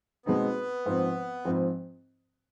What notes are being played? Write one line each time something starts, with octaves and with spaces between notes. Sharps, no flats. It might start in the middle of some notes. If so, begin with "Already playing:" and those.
B2 G#3 B3 C4 D#4
G#2 F3 C4
G#2 F3 C4